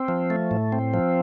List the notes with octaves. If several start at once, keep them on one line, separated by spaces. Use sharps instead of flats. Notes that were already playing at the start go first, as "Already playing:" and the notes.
Already playing: C4
F3
A3
A2
C4
F3